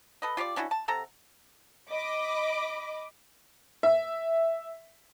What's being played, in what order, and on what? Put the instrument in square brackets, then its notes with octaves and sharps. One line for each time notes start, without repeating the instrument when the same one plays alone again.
[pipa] A4 B4 D#5
F4 G4 C#5 D5
C#4 D4 E4 F#4
A5
C3 A4 F#5 A#5
[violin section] D#5 B5 D6
[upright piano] E5